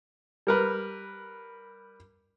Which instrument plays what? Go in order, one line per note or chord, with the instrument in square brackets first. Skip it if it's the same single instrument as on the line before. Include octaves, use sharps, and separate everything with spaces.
[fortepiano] G3 A#4 B4